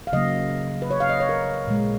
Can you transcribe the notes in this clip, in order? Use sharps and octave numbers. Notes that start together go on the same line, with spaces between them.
F5
C#3 F#3 A#3 D#5
B4
C#5
F5
D#5
C#5
A#4
A#2 G#3